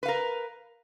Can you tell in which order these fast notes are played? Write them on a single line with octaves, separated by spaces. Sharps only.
B4 F5 A#4